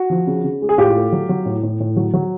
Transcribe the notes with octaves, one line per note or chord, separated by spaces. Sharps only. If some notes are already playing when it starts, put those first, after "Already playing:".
Already playing: F#4
F3
C#3
C#3
G#3
G#4
A2 F4 G4
A3
F#3
F#3
A2
A2
A2
F#3
F#3